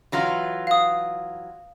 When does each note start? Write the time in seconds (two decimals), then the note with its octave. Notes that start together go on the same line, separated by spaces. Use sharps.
0.12 E3 F#3 F4
0.67 F5 D#6